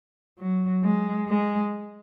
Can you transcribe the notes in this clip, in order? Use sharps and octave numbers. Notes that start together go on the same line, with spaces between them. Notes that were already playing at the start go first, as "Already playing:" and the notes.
F#3
G#3
G#3